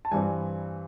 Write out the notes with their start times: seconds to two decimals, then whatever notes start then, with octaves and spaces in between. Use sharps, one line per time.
0.05 A5
0.11 G2 E3 G3 C4 G#5